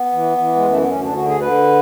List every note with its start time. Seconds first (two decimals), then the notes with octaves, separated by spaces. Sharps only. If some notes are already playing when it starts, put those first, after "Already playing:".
Already playing: B3
0.12 E3
0.38 E3
0.56 G#3
0.64 F#2 A3
0.78 B3
0.89 D2 C#4
1.02 D4
1.14 D3 F#4
1.28 G#4
1.40 D3 B4